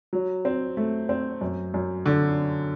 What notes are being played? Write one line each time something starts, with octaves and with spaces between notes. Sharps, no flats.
F#3
C4
A3
C4
F#2
F#2
D3